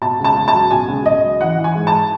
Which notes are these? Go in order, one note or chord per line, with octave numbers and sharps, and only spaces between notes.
B2 A5
C#2
A5
C#2
A5
F#3
B2 G#5
C#2
C#2 D#5
F#3
E3 F#5
E3
G#5
G#2
A5